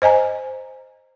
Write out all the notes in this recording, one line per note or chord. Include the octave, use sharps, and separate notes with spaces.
C5 D#5 G#5 A#5